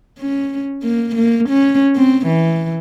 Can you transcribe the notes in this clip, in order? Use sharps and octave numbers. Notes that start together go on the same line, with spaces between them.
C#4
A#3
A#3
C#4
C4
E3